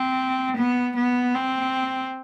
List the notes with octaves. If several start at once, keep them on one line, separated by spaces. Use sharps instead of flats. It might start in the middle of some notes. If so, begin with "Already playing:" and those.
Already playing: C4
B3
B3
C4